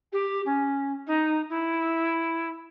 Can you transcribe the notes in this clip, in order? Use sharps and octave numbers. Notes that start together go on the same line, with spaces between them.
G4
C#4
D#4
E4